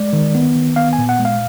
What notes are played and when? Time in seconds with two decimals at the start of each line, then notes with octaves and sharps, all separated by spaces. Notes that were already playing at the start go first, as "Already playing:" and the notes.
Already playing: G#3 D5
0.13 D#3
0.35 B3
0.55 D#3
0.76 B3 F5
0.93 G#5
0.98 A#2
1.09 F#5
1.19 G#3
1.25 F5